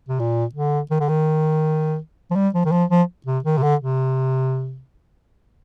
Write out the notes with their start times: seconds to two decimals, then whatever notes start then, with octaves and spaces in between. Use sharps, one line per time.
0.09 C3
0.19 A#2
0.55 D3
0.91 D#3
1.00 D3
1.09 D#3
2.31 F3
2.36 G3
2.54 F3
2.66 D#3
2.72 F3
2.90 F3
3.26 C3
3.44 D#3
3.58 C3
3.63 D3
3.80 C3